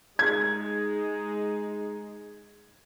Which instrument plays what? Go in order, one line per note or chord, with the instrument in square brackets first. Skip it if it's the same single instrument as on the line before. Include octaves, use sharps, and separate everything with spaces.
[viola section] G#3 D#4 [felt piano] G#6